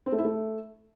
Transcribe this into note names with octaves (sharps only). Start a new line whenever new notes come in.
C4
A3
E4
A3